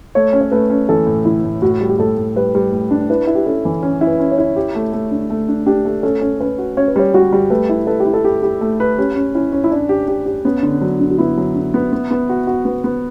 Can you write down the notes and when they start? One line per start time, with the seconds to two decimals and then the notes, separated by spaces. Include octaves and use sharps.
0.15 A3 C#5
0.33 C#4
0.41 C#5
0.51 A3 B4
0.70 C#4
0.89 E3 A4
1.06 A2
1.25 E3 E4
1.44 A2
1.62 A2 F#4
1.81 G3
1.89 G4
1.98 A2 A4
2.17 A2
2.36 G3 B4
2.55 G3
2.72 A2
2.91 D4
3.10 E4 B4
3.27 E4
3.35 G4
3.46 C#4 A4
3.65 E3
3.83 C#4
4.01 E4
4.07 B4
4.20 C#4
4.31 C#5
4.38 E4
4.56 G4
4.75 A3
4.93 A3
5.11 D4
5.30 A3
5.49 D4
5.66 D4 G4
5.85 A3
6.03 C#4 A4
6.21 C#4
6.40 C#4 B4
6.59 F#4
6.77 C#4 C#5
6.88 B4
6.96 G3 C#5
7.14 G3 F#4
7.32 G3
7.50 A3 B4
7.69 E4
7.87 A4 B4
8.00 G4
8.05 E4
8.14 A4
8.25 G4
8.43 G4
8.61 A3
8.80 B4
8.98 C#4 G4
9.16 C#4
9.35 C#4 E4
9.52 C#4
9.64 E4
9.71 C#4 D4
9.89 G4
10.08 G4
10.26 G4
10.45 B3 C#4
10.63 D3
10.81 F#3 D4
11.00 D3
11.11 F#4
11.18 B3 E4
11.37 F#3
11.55 D3
11.74 B3
11.93 B3
12.11 B3
12.29 F#4
12.47 F#4
12.65 B3
12.84 B3